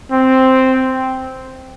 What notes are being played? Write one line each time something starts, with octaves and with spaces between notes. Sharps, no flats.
C4